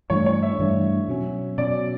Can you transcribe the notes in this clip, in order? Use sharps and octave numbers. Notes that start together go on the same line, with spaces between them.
G2 E3 A3 D4 C#5
C#5
E5
G2 E3 A3 D4
B2 F#3 C#4
B2 F#3 C#4 D5